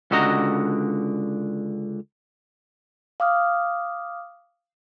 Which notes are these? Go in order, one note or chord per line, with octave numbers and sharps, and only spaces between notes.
C#2 D3 F#4 D#5 A#5
F5 D6 D#6 F6